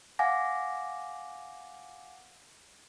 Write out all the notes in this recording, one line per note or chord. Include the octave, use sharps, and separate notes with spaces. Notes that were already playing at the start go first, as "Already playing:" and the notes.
F5 F#5 G#5 D6 A#6